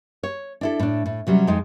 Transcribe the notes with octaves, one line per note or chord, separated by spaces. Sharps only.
C#5
D4 E4 A4
A2 D4
A2
C3 F#3 G3 C#4
F2 G#3 D#4